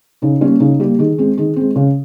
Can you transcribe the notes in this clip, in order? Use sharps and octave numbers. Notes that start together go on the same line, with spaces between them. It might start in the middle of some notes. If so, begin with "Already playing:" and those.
C#3 D#4
G3 A#3 C#4
C#3 D#4
G3 A#3 G4
D#3 G#4
G#3 C4
D#3 G#4
G#3 C4
C#3